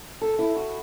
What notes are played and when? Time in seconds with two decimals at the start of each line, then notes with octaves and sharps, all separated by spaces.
0.21 A4
0.39 E4
0.56 F#4